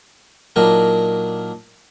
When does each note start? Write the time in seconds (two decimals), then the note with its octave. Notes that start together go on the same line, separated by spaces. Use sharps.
0.56 A#2 F#3 D4 D#4 A#4 A#5